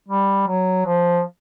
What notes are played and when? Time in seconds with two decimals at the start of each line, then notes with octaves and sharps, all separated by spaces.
0.08 G3
0.47 F#3
0.86 F3